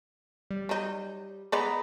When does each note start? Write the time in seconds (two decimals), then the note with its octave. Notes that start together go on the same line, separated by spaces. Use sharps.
0.51 G3
0.69 F#3 D#4
1.52 G#3 B3 D5 D#5 A#5 B5